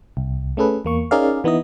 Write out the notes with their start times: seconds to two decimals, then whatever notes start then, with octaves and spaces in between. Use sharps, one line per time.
0.17 C2
0.57 A3 C#4 G#4 A4 B4
0.85 E2 A#3 C#6
1.11 C#4 D#4 G#4 A#4 D5 F5
1.44 E3 B3 D#4 E4 D#5